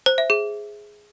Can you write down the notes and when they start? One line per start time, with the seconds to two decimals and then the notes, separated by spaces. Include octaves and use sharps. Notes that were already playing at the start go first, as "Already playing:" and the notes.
0.06 C5
0.18 E5
0.30 G#4